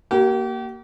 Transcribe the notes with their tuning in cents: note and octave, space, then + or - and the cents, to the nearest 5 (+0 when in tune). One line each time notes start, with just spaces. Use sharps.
A#3 +0 G4 -40